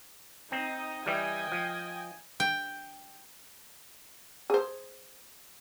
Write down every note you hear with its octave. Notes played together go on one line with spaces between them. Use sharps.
C4 D#4 D#5
E3 G3 D#5 G5 G#5
F3
G5
G#4 C5